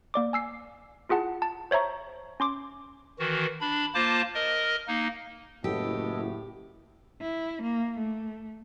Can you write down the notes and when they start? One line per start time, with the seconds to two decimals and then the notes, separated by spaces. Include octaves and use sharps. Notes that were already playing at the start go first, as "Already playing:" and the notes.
0.14 A#3 D5 D6
0.33 G#5 E6 C7
1.09 E4 F4 G#4 F#5 A5
1.42 A5
1.71 C5 C#5 E5 A#5 C#6
2.40 C#4 C6 D6
3.19 D#3 E3 F#4
3.61 D4 B5
3.94 A#3 F4 C5 A5 D6
4.34 A#4 D#5
4.88 A#3 D#4
5.64 F#1 A2 B3 G4 A4 D#5
7.21 E4
7.63 A#3
7.98 A3